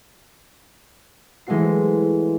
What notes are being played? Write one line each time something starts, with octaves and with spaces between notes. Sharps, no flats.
E3 G#3 A3 C4 F#4 C7